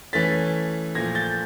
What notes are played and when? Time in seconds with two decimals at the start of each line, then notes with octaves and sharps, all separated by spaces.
0.13 E3 A3 C#4 A6 B6
0.95 A#2 F3 A3 G#6 A#6
1.15 G6 A6